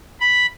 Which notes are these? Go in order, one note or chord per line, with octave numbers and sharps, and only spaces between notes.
B5